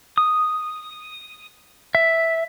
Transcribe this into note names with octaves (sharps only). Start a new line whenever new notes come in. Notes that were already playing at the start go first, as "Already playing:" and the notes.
D#6
E5